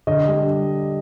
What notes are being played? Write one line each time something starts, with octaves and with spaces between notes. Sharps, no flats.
D3 D#5
G3 D4